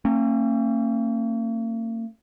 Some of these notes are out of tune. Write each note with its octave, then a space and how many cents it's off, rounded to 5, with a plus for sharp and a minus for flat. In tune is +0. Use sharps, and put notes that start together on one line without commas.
A#3 -45 C#4 -40